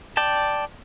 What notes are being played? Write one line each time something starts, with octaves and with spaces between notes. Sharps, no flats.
D5 G5 A5